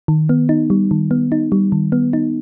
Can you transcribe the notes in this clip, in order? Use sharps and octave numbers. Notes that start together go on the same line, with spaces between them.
D#3
B3
D#4
G3
D#3
B3
D#4
G3
D#3
B3
D#4